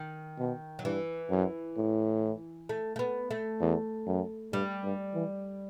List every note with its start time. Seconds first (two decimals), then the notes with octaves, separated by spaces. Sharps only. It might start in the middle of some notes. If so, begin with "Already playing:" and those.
Already playing: D#3
0.38 B2
0.79 F#3
0.84 G2 E3
1.30 F#2
1.77 A2
2.69 A3
2.96 A3
2.99 B3
3.31 A3
3.60 E2
4.07 F#2
4.53 G2 G3
4.84 G2
5.14 E3